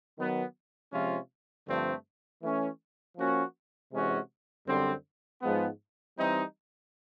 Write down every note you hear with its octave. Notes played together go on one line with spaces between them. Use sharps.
D#3 F#3 B3
C3 F3 G#3 C#4 F4
G2 D3 F3 A3 C4
E3 A3 C#4
F3 A#3 C#4 F#4
C3 E3 G#3 C#4 F#4
F#2 D3 G3 C4
G#2 F3 G#3 B3
E3 G3 C4 D#4